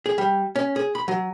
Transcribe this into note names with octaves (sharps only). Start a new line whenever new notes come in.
G#4
G3
C#4
G#4
B5
F#3